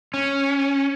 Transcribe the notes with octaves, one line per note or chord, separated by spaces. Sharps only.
C#4